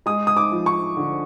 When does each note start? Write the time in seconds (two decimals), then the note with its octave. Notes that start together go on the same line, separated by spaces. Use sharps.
0.06 G#3 D#6
0.27 D#6
0.37 D6
0.52 F3
0.66 C#6
0.97 D3